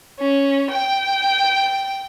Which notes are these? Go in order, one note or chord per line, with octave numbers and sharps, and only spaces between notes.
C#4
G5